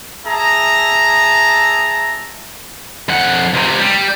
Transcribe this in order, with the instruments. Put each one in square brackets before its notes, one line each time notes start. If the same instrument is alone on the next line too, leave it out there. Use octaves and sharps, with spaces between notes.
[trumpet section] G#4 E5 A5 A#5
[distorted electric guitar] F2 F#5
C#2 C3
G3